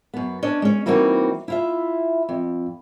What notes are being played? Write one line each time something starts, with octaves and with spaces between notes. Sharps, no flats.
F#2 B3
C#4 D4 D#5
G#3 C#4
E3 G3 A#3 C4 D#4 F#4
E4 F4 E5
F2